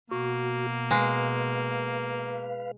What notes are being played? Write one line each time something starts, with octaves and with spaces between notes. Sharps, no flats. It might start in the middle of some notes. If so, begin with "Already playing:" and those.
B2 A#3 F#4
G#3 B4 F5